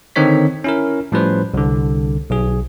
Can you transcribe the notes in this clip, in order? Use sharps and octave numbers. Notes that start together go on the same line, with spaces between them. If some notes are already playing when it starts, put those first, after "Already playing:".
D3 D#3 C4 D#4 C#5 B6
C#4 E4 A#4
A2 F3 G3 C#4 B4 C5
C2 D3
B1 G#4